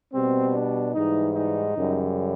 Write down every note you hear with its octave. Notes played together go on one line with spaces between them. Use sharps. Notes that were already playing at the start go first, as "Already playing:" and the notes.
B2 G3 C4
D4
G#2 E3 G3 D#4
D#4
F#2 C#3 E3 G3